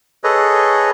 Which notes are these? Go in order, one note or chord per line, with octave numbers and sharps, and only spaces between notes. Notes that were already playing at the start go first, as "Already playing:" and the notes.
G#4 A4 B4 C#5 D#5